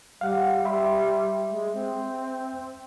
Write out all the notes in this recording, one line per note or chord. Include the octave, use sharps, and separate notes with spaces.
G3 F5 F#5
G3 E5 B5 C6
G#3
C4